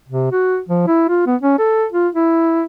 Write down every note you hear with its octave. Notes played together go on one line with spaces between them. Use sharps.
C3
F#4
F3
E4
F4
B3
C#4
A4
F4
E4